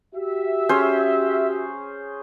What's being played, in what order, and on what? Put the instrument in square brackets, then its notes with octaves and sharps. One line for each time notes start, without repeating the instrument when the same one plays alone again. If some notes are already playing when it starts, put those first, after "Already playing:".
[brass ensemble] F#4 G4 E5
[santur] C#4 G#4 C5